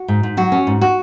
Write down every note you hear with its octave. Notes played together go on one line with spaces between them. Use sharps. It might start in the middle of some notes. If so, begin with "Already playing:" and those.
Already playing: F#4
G#2
G#2
F#3 F#4
C#4
G#2
F#4